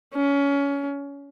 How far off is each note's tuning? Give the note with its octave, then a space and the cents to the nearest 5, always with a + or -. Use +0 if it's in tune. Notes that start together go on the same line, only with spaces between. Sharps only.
C#4 +25